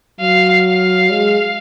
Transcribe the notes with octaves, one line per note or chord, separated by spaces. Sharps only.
F#3 F5
F5
G#3